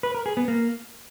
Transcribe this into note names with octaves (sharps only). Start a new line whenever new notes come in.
B4
A#4
G#4
B3
A#3